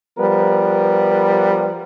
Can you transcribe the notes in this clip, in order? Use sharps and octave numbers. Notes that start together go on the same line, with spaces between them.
F3 G3 B3 A#4 B4